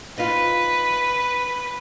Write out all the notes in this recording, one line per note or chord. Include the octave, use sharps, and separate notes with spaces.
D#4 F4 B4